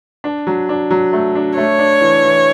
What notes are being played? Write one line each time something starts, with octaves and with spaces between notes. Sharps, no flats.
D4
F#3
D4
F#3
A3
D4
A3 C#5
D4
E3
E3